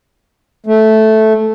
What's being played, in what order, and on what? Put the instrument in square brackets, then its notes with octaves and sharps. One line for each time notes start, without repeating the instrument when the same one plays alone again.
[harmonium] A3